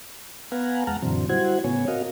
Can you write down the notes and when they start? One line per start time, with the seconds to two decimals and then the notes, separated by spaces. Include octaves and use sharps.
0.52 B3 B4 F5 F#5 G#5 A#5
0.87 E2 G#3 F#5 A5 A#5 F6
1.02 F#2 A#2 D3 E3 F#3 C4
1.29 G3 E4 F#4 C5 F#5 G#6
1.64 A2 C#3 B3 C#5 G#5
1.88 C4 F#4 A#4 D#5 F5